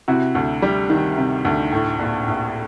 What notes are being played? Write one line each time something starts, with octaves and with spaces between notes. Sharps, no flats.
C3 E4 F#4
D2
G3
D#3
C3
D2
A2
A#1
A#1